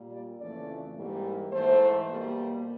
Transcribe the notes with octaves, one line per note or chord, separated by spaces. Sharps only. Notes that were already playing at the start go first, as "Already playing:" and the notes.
Already playing: A#2 G3 A#3
D5
F2 C#3 E3 A3 D5
G#2 E3 G3 A#3
G#2 E3 A3 C5
B2 G3 A#3